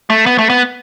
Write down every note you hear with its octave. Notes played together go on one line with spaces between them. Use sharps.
A3
B3
A3
B3